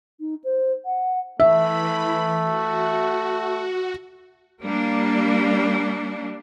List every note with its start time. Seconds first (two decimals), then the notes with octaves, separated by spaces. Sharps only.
0.20 D#4
0.44 C5
0.86 F#5
1.40 E3 A3 E5 B5
2.43 F#4
4.62 G3 A#3 D4